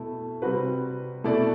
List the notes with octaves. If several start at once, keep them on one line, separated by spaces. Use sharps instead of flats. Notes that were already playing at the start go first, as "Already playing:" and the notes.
Already playing: B2 A3 E4
C3 G3 C4 F#4 B4
B2 A3 E4 A4 D5